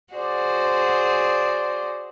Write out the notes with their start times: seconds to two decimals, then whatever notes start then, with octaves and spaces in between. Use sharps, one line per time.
0.14 F#4 G#4 C5 D5